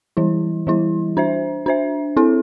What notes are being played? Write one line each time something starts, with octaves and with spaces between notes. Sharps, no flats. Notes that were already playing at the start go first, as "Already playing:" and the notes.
E3 G3 E4
E3 G3 E4
D4 C5 E5
D4 C5 E5
C4 E4 A4